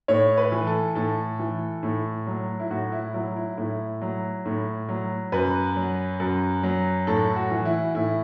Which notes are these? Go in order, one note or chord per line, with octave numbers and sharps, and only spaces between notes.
A2 C#5
B4
E3
A4
A2 A4
E3
A2
F#3
E4
A2 F#4
E4
F#3 E4
E4
A2 E4
F#3
A2
F#3
F#2 B4
F#3
F#2
F#3
A2 A4
F#4
E3
E4
A2 E4